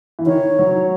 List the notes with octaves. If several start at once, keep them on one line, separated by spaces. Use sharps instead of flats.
E3
D#3 C#5
F#3